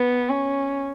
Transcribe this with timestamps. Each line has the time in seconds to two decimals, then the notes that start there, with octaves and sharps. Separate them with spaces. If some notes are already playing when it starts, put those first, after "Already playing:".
Already playing: B3
0.29 C#4